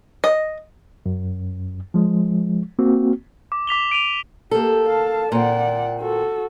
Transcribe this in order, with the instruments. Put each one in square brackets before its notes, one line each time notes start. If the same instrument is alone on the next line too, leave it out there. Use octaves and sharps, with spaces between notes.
[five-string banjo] D#5
[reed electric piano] F#2
F3 G#3
A#3 C4 F#4
[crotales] D6
D6 B6 F7 G7
D7 D#7 F7
[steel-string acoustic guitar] A#3 A4 [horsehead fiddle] G4
[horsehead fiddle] F5 A5
[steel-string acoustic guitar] A#2 C4 [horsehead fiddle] D5 F#5
[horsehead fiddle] F#4 A4